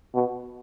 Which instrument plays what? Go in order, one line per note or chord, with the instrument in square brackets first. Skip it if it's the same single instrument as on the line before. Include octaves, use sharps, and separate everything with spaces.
[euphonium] B2